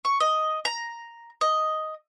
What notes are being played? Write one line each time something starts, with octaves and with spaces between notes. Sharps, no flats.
C#6
D#5
A#5
D#5